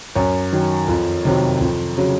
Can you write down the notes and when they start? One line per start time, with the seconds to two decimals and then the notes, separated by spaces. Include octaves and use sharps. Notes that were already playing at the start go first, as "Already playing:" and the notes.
0.15 F#2 C#5
0.53 D#3 F#3
0.88 F2
1.25 C3 D#3 F#3
1.61 F2
1.98 C#3 F#3